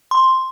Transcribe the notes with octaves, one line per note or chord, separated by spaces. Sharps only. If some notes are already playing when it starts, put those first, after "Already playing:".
C6